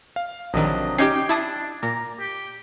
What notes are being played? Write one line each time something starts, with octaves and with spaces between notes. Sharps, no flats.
F5
A#1 C3 D#3 F#3 D4 D#5
C#4 D#4 G4 G5 D6 G#6 C7
D4 E4 A5 D#6
A#2 A#5
G4